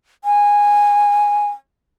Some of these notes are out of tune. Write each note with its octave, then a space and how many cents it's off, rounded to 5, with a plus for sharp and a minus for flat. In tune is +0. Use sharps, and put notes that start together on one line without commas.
G#5 -15